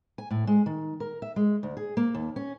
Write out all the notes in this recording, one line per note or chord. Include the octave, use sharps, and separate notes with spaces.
G#5
A2
G#3
D#3
A#4
E5
G#3
D2
G#4
A#3
D#2
C#4